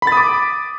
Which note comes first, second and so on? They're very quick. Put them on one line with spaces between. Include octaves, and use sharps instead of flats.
B5 A6 D#6 D6